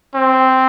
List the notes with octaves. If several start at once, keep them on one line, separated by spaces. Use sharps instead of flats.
C4